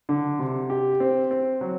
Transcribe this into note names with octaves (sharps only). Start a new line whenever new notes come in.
D3
C3
G4
C4
C4
F#3